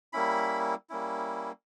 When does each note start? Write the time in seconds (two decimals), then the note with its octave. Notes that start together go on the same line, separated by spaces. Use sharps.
0.13 G3 A#3 C#4 E4 B5
0.90 G3 A#3 C#4 E4